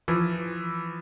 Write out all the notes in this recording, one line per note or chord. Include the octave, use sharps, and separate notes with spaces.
E3 F3